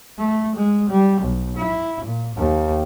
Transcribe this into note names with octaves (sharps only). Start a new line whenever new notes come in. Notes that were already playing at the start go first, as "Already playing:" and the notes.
A3
G#3
G3
B1
E4
A#2
D#2